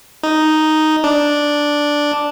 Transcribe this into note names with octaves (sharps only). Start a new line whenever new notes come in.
D#4
D4